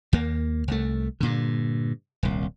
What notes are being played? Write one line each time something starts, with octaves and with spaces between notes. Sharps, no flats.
D#2 A#3
C2 A3
G2 A#2 D3
D#1 C2